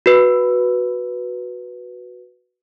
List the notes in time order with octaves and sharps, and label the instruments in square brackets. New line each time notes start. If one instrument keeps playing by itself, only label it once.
[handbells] F#4 B4